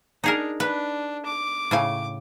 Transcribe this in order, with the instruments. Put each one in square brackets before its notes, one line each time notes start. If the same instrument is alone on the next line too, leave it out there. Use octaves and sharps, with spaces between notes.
[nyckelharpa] D4 [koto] D#4 G#4 A#4
[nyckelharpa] D4 [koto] B4
[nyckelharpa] D6
[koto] A2 C#3 G#5